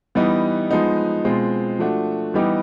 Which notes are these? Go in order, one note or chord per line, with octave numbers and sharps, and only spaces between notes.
E3 G3 B3 D#4
F3 G#3 B3 D#4
B2 G#3 C4 F4
F3 A3 D4 F#4
E3 G3 B3 D#4 G4